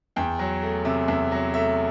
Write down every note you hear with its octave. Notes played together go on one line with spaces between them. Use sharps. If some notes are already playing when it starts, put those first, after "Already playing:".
E2 G5
F#3
A3
C3 E5
E2 E5
F#3
A3 E5